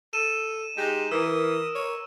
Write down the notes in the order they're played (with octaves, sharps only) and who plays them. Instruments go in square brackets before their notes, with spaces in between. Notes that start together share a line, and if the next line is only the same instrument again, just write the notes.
[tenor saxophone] A4 [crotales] D#7 E7
[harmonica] G#3 D#4 [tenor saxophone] G4
[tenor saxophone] E3 [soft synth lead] A#4 [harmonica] D#6 [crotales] E6
[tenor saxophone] C#5